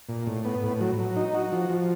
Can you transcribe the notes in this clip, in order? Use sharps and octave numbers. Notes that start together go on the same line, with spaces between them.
A#2
A2
B3
A2
F#3
F#3
D#4
F#4
F3
F3